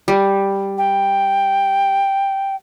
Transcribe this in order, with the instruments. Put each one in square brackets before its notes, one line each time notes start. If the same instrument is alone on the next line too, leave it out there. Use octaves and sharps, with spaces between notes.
[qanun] G3
[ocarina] G5